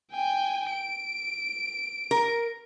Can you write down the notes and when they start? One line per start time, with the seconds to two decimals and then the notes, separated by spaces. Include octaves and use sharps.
0.12 G5 G#5
0.72 D7
2.11 A#4